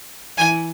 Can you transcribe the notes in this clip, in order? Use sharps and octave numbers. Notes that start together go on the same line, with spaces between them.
E3 E4 G#5